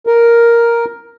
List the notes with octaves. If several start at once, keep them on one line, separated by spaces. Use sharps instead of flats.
A#4